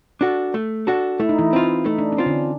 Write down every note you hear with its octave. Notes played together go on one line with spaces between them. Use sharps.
D4 F#4 A4
A3
D4 F#4 A4
A3 E4
D#4
E3 E4
C4 F4
A3 D#4
D4
C#4
C4 F4
D3 D4